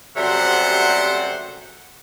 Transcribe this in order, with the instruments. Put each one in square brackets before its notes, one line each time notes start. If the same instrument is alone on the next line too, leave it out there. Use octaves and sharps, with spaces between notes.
[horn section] F#2 C3 G3 A3 C5 F#5